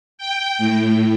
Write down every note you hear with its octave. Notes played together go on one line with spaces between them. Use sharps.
G5
A2